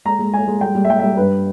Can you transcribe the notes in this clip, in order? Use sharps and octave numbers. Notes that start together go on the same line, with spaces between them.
G#3 A#5
G#3
G#3 G#5
G#3
G3 G5
G3
E5
G3 G5
G3 E5
G2 B4